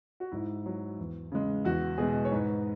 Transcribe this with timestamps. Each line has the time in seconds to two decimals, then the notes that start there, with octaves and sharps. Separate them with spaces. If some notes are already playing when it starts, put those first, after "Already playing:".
0.20 F#4
0.32 G#2 E4
0.66 F#3
0.98 E2
1.32 C#3 G#3
1.65 E2 F#4
1.98 B2 G#3 G#4
2.25 C#5
2.31 G#2 B4